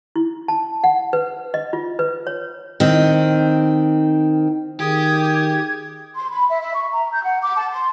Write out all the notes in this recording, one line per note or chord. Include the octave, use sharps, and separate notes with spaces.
E4
A5
F#5
B4
D#5
F4
B4
C#5
D#3 C4
D#3 G4 G#4 D#6 G#6
C6
B5
E5
E5
C#6
A#5
G6
F#5
D6
A5
C6